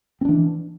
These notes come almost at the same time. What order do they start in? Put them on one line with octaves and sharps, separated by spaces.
C4 D4 E3